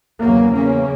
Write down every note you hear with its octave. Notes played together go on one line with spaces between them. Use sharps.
E2 C#3 F#3 A#3
A#3 C#4